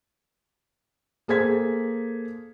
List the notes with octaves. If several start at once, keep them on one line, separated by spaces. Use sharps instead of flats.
A#3 G#4 A4 C5 G#6 B6